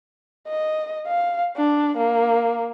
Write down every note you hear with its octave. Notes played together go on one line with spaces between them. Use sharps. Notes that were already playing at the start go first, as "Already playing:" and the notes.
D#5
F5
D4
A#3